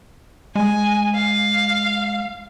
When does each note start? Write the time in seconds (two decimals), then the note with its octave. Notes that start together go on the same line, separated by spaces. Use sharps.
0.55 G#3 G#5
1.14 F5